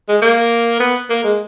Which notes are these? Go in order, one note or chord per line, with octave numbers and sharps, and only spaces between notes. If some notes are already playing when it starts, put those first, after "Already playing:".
G#3
A#3
B3
A#3
G#3